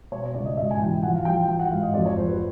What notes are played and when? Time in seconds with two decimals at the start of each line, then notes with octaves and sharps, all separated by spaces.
0.12 B2 C#5
0.23 C#5
0.34 C#2 D5
0.45 D#5
0.57 G#2 E5
0.71 G#5
0.79 E3 G5
1.03 F3 F#5
1.14 F5
1.25 F3 G5
1.48 E3 G5
1.59 F#5
1.71 G#2 F5
1.82 D#5
1.94 F2 D5
2.06 C#5
2.17 F3 C5
2.28 B4